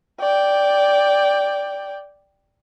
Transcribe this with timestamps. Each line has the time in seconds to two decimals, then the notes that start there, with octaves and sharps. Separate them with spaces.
0.21 D5 G5